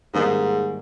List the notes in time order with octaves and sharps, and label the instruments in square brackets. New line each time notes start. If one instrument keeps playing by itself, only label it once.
[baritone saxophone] G#2 [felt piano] D#3 G3 A#3 D#4 G#4